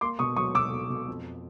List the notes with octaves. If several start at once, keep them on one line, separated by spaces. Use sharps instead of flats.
A#3 C6 D6
B2 C#6 D#6
F#3 C#6 D#6
B2 D6 E6
B2
B2
F2